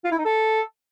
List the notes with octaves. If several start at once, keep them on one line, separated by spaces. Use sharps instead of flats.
F4
E4
D#4
A4